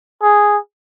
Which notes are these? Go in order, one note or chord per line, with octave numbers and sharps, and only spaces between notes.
G#4